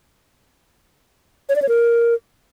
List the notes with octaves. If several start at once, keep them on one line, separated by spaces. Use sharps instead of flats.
C#5
D5
C#5
A#4